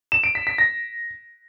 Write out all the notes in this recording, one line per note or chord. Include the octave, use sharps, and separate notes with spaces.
E7
D7
B6
B6
A#6